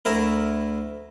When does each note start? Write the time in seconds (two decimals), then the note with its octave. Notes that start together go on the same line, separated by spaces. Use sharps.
0.05 D2 E4 A#4